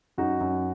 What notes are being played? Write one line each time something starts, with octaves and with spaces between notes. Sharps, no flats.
F#2 D#4 F#4
F#2